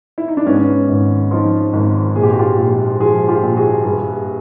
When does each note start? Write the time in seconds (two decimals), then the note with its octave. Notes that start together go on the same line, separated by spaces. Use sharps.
0.18 E4
0.28 D#4
0.37 D4
0.47 G#2 B3 C#4
0.89 G#1
1.31 F3 D#4 F4
1.73 G#1
2.16 A#2 G#4
2.23 G4
2.32 F#4
2.39 F4 G4
2.58 A#1
3.00 F3 F#4 G#4
3.28 F4 G4
3.43 A#1
3.56 F#4 G#4
3.85 G2